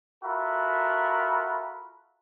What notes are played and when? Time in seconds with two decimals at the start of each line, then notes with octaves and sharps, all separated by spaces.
0.24 F4 F#4 A4 A#4 E5 B5